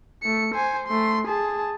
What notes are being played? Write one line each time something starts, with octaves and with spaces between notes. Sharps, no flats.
A3 C#7
C5 G#5
A3 C6
G#4 A5